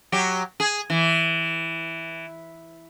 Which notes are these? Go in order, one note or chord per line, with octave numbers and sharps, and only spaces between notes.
F#3 G4
G#4
E3